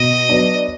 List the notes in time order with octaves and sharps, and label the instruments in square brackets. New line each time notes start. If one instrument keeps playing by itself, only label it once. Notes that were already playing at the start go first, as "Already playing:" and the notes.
Already playing: [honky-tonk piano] B2 [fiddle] D#5
[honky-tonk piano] F#3 B3 D4